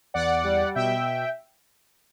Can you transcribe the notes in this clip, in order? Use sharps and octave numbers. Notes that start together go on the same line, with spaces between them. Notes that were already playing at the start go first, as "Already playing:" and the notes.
E2 D5 F#5
G3
B2 E5 G5